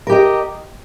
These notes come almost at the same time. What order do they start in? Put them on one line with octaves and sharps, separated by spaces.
A#4 G4 D#5